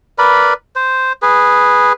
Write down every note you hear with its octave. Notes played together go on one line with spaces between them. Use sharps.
A#4 B4 D5 B5
C5
G#4 B4